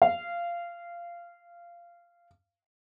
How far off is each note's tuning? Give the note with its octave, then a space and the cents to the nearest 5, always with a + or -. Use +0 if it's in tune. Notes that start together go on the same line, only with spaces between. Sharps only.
F5 -15